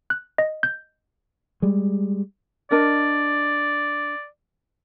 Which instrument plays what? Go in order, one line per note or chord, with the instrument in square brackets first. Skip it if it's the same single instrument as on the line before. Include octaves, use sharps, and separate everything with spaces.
[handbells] F#6
D#5
G6
[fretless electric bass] G3 G#3
[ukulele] D4 A#4 D#5 [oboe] D5